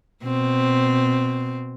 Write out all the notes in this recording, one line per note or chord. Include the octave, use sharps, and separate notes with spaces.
B2 C4